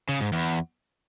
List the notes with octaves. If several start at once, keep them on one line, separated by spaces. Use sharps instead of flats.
C#3
G#2
E2